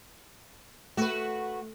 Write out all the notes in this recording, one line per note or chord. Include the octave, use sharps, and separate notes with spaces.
A3 F#4 B4